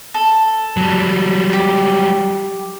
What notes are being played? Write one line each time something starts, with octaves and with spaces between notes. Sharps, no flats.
A4
F#3 G3
G4